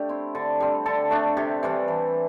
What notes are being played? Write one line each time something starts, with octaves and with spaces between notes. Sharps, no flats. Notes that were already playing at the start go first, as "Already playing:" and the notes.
Already playing: A3 D4 G4
C4 E4
D3
G3 C4
D3 A4
A3 D4
C3 G4
E3 G3 D4
E3